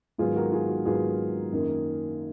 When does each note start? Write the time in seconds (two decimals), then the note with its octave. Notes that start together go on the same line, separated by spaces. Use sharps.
0.18 G#2 D#3 F#3 B3 F4 G#4
0.36 F#4 A#4
0.52 F4 G#4
0.69 F#4
0.85 G#2 D#3 F#3 B3 F4 G#4
1.52 F#2 D#3 A#3